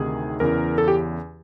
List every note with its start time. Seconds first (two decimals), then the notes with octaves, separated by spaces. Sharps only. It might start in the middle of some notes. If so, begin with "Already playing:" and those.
Already playing: D2 C3 D#3 G#4
0.40 E2 C#3 E3 A#4
0.78 A4
0.88 G4